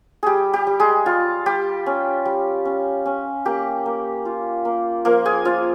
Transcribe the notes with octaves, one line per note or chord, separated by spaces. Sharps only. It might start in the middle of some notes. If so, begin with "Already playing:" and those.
G3 G4 G#4
G4
G3
G#3 G#4
G3 F4
G3 G4
C#4
G3
C#4
C#4
A#3 G4
A#3
F4
A#3
F3 A#3 A#4
G#4 G#5
F3 F4 F5